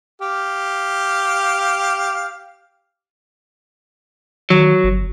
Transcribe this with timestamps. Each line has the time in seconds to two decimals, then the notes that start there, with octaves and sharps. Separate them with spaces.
0.22 G4 F5
4.50 D#3 F#3
4.84 G1